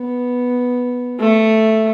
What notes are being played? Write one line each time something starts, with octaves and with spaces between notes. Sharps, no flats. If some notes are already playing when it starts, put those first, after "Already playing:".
Already playing: B3
A3